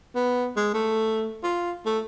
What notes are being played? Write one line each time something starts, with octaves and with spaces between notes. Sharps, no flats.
B3
G#3
A3
F4
A3